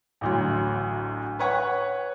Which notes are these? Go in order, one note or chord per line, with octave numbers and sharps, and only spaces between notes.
A1 D2 F#3
B4 C#5 F#5 C#6